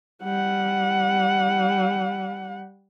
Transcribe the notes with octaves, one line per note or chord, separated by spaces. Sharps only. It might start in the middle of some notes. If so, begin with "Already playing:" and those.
G3 F#5